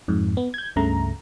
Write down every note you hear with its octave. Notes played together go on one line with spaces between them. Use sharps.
F2 G#2
B3
G6 G#6
C#2 G2 C#3 A3 A#5